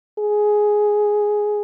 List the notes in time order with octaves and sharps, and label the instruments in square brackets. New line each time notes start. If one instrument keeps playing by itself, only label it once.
[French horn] G#4